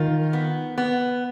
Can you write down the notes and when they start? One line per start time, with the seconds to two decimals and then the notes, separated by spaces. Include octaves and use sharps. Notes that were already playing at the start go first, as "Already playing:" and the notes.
Already playing: D#3 F4
0.33 B3
0.78 B3